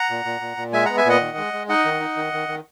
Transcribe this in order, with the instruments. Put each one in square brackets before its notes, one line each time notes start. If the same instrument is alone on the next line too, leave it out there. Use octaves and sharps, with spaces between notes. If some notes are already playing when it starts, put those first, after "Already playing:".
Already playing: [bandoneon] F#5 A#5
A#2
A#2
A#2
A#2
G#3 E5 G#5
B3 F#5 A#5
E5 G#5
A#2 D#5 F#5
D#3
G#3
G#3
D#4 D#5 F#5
D#3
D#4
D#3
D#3
D#3